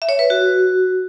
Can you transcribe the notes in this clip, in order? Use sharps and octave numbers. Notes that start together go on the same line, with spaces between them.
E5
C#5
B4
F#4